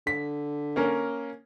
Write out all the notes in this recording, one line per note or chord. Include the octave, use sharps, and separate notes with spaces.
D3 B6
A#3 C#4 A#4